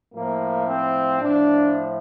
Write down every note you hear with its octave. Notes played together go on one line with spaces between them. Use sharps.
A2 F3 A#3
C4
A2 F3 D4